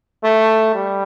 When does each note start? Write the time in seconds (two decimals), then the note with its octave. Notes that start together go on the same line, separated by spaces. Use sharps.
0.24 A3
0.75 G3